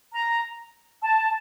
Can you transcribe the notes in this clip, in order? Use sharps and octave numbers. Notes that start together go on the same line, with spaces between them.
A#5
A5